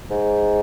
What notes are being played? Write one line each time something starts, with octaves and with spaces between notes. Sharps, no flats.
G#2